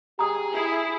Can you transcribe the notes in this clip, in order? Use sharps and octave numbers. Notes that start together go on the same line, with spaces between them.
G4 G#4 A#5 D#6
E4